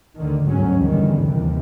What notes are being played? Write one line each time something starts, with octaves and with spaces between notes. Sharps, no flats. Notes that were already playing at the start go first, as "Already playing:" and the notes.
D2 D3 D#3
G1 D2 G#2 F#3 C#4
E2 G2 D3 D#3 G3
D#2 C3 E3